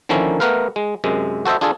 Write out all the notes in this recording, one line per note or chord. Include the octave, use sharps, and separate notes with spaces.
D3 D#3 F3 A#3 C#4 E4
A3 B3 A#4 B4 F5
G#3
F#2 C3 G#3
F#4 A4 C5 D#5 E5
D4 F4 G#4 A4 D5